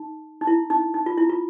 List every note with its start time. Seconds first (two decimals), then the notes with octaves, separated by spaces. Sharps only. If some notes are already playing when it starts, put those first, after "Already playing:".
Already playing: D#4
0.41 D#4
0.47 E4
0.70 D#4
0.94 D#4
1.06 F4
1.18 E4
1.29 F4